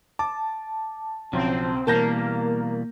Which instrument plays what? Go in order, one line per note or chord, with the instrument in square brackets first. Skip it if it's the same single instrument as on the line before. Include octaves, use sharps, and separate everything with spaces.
[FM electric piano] A5 [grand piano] D6
[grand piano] B1 C#3 [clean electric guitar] F3 [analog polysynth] C4
[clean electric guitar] B2 E3 G3 [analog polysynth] A#3 [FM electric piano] A#4 [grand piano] A5 G6 A#6